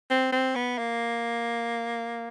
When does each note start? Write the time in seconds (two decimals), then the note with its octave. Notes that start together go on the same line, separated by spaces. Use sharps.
0.10 C4
0.32 C4
0.55 B3
0.78 A#3